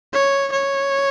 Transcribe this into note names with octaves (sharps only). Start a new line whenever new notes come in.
C#5
C#5